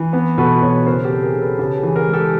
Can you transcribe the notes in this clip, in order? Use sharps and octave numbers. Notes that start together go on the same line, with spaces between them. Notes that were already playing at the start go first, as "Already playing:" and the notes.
Already playing: E3
B3
B2 A4 B4
B2 B4 C#5
C#3 A#4 C5
G4 A4
C4
G#4 A#4
C#3
A4 B4
C#3 G4 A4
G#4
E3
G#4 A#4
G#3
G4 A4